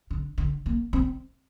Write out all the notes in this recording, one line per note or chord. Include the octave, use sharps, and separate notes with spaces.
D3
D3
A#3
C4